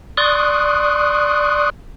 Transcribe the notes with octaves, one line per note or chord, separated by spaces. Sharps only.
D5 C6 C#6 D#6 F#6